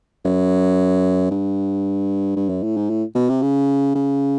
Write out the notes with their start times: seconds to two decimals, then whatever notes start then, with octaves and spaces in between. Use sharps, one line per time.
0.25 F#2
1.31 G2
2.36 G2
2.49 F#2
2.63 A2
2.77 G#2
2.90 A2
3.15 B2
3.29 C3
3.42 C#3
3.95 C#3